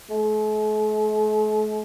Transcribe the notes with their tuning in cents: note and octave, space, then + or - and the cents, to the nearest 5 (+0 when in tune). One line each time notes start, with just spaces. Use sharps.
A3 -45